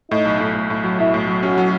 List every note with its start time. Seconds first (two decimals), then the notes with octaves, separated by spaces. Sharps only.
0.11 A2 D#4
0.25 B1
0.40 A2
0.55 A2
0.70 A2
0.84 F#3
0.99 B1 E4
1.14 A2
1.28 F#3
1.43 C#4 F#4
1.58 F#3